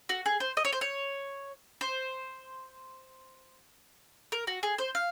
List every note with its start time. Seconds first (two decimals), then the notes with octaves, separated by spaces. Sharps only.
0.09 F#4
0.26 G#4
0.40 C5
0.57 D#5
0.65 C#5
0.73 C5
0.81 C#5
1.81 C5
4.32 A#4
4.47 F#4
4.63 G#4
4.78 C5
4.95 F5